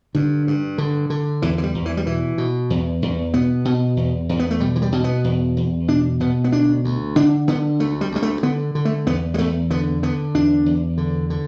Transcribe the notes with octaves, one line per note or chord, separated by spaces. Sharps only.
G2 D3
G2
D3
D3
E2 E3
E3
G3
E2
E3
G3
B2 E3
B2
E2
E2
B2 B3
B2
E2
E2
B3
A3
B2 G3
E3
G3
B2
B3
E2
E2
B2 D4
B2 B3
B3
D2 D4
D2
D3 D4
D3 B3
D2 A3
G3
D2 G3
A3
D3 B3
D3
A3
E2 B3
G3
E2 A3
D3 B3
D3 B3
E2 D4
E2
D3
D3